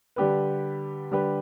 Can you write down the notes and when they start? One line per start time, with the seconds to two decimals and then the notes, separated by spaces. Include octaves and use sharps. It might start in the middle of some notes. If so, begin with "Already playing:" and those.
0.16 D3 G3 D4 G4 B4
1.11 D3 G3 D4 G4 B4